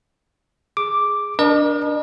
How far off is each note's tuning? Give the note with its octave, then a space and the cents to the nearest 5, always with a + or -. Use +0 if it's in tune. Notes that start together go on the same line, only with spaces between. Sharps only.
G#4 +0 D6 +0
D4 +0 A#4 +40 D#5 -40